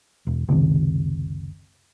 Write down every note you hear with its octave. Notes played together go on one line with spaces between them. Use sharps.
E1
F#1 C#2 C3 D#3